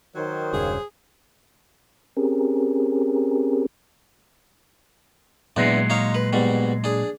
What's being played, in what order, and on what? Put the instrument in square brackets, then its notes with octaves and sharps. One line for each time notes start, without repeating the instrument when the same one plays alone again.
[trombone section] D#3 [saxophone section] F#3 C5 C#5
[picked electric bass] E1 G2 C#3 [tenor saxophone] G#4
[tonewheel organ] C4 C#4 G4 G#4 A#4
[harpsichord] E2 D4 [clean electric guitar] A#2 F#3 G#3
[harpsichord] D#4 C#5 F5
B4
G#2 B2 G3
D4 G#4